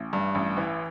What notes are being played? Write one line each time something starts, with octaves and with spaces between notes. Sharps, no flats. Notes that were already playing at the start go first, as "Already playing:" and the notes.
Already playing: A1
G2
A1
E3